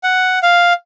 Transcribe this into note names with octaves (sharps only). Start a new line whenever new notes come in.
F#5
F5